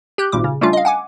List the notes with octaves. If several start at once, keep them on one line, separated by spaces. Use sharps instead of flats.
G4 F#6 G6
G#1 A#2 G3 D6
C#3
G3 A3 C#4 D4 F4
D#5 F5
F#5 G#5 D6